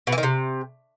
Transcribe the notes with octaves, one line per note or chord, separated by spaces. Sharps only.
B2
E3
D#3
C3